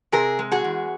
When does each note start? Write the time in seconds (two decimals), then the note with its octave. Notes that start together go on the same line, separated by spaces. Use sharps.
0.12 C3 G#4 A#4
0.39 G#3
0.52 F#4 G#4
0.64 E2